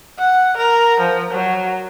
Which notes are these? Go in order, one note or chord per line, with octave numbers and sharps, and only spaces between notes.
F#5
A#4
F3
F#3